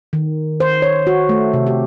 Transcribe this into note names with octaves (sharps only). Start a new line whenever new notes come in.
D#3
C5
C#5
F#4
A3
C3
G4